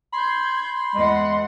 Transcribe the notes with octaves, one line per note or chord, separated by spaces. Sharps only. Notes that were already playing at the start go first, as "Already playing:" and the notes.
B5 C6 G6 G#6
E2 G#3 F#5